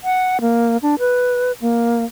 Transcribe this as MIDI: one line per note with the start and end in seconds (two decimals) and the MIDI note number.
0.04 0.41 78
0.41 0.77 58
0.82 0.95 62
0.99 1.52 71
1.61 2.04 58